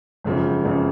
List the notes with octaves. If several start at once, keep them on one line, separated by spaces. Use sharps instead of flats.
G#1 F#2 C#3 F3
G#1 F#2 C#3 F3